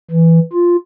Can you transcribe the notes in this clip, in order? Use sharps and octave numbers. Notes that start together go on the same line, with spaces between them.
E3
F4